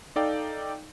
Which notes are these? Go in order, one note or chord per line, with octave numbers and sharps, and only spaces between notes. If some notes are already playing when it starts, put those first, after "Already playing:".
D#4 A4 D5 F5 G5